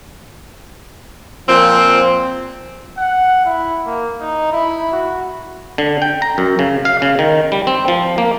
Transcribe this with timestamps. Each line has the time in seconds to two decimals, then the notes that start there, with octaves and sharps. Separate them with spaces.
1.49 A#2 F3 C4
2.98 F#5
3.45 E4
3.86 A#3
4.20 D#4
4.52 E4
4.92 F#4
5.78 D3
6.02 G5
6.22 A#5
6.38 F#2
6.59 C#3
6.85 F5
7.02 C#3
7.19 D#3
7.52 G3
7.67 C4
7.88 F3
8.18 A#3